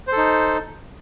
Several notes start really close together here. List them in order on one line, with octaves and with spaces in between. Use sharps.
C5 A4 D#4